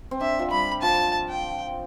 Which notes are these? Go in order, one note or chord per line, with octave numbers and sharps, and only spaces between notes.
C4
D4 E5
F3
G3 B5
F3 A5
G5